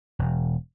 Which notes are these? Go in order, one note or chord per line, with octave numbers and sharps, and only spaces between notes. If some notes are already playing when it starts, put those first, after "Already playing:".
E1